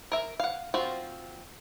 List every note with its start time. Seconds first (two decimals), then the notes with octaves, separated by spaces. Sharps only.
0.12 A#4 E5
0.40 F5 F#5
0.74 F3 C4 F4 F#4